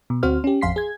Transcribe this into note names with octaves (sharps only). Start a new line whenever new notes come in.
B2
D2 C4 F#4 C5 F6
C#4 G4
A1 F2 F5 C6 B6 C7
G#4 G#6